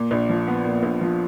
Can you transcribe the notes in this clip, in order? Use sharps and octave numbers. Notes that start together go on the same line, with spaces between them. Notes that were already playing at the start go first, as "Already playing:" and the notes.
Already playing: A#2
A#1
F3
B3
A#2
A#1
F3